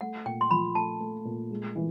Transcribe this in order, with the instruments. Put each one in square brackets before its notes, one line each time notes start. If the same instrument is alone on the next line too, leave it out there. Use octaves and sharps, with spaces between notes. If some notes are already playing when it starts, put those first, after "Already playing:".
[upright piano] A3 [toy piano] F#5
[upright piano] A#2 [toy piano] G5
[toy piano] C6
[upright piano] F3 [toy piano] B5
[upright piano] A3 [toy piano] A5
[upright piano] A3
A#2
G#3
E3